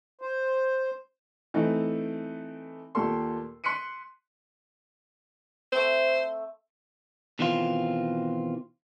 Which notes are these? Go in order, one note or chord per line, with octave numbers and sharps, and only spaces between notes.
C5
E3 A3 C4 D#4
D#2 A#2 G4 A4 C6
C6 F#6 B6 C#7 D#7
A3 C4 C5
B2 D#3 E3 C4 F4